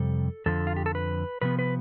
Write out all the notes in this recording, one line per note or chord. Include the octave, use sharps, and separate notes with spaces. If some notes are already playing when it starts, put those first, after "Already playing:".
Already playing: F2 C3 G3 A4
F2 D3 F3 A4
F4
G4
A4
B4
C3 F3 B3 B4
B4